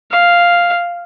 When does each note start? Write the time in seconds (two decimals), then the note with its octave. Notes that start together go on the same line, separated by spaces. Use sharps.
0.11 F5